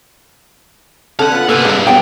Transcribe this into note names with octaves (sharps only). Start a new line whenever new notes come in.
D3 C#4 A4 F5 F#5
B3 F4
C3 A#3 A4 B4 G#5
G2 C#3 B5
F3 F#3 B3 G5